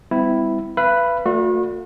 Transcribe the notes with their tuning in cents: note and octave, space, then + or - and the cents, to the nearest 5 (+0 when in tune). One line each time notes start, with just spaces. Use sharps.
G3 +25 C4 -45 E4 +0
B4 +0 F5 -45 B5 +0
A3 +30 F#4 -40 D5 +0